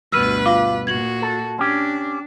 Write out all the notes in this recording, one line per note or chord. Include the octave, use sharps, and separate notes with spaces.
D2 G2 B2 B4 E6 F6 D#7
F4 F5 D6
A#2 F#4 G#6 F#7
A4
C#4 D4 G4